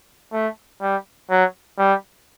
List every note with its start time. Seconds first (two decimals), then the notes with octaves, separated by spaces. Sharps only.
0.33 A3
0.82 G3
1.30 F#3
1.79 G3